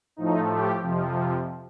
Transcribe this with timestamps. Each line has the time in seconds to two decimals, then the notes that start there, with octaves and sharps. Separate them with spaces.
0.16 A2 F3 A3 D#4
0.50 G4
0.81 F2 C3 F3